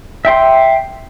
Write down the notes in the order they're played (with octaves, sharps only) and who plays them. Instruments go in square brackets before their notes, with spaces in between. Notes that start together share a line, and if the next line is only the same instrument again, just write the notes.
[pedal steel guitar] E5 G5 C6